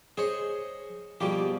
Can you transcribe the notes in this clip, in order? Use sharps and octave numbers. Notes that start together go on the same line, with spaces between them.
G#4 C5 C#5 D#5
B2 F3 G3 A#3 G4 G#4